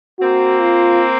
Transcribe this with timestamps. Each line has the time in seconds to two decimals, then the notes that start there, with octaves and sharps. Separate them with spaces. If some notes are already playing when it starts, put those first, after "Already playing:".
0.19 A#3 C4 F#4
0.61 F4